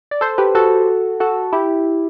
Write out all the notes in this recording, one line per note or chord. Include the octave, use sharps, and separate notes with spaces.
D5
A4 C5
G4 B4
F#4 A4
F#4 A4
E4 G4